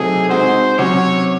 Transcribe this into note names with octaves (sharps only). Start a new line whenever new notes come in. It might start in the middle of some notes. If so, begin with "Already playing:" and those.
Already playing: C3 F#3 A3 D#4 G#4 A4
G#3 C4 D#4 F#4 C5
C3 F#3 C#4 F#4 C#5